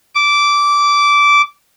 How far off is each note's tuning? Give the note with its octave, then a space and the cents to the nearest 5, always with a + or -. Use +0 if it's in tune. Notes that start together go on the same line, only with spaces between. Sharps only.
D6 -15